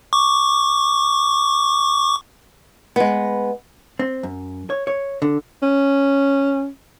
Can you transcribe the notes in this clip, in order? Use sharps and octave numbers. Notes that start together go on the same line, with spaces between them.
C#6 D6
G#3 B3
C4
F#2
C#5
C#5
D3
C#4